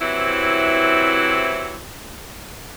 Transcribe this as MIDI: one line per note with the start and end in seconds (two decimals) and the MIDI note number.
0.02 1.77 48
0.02 1.77 52
0.02 1.77 54
0.02 1.77 60
0.02 1.77 64